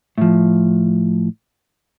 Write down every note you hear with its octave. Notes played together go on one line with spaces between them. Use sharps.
A2 F3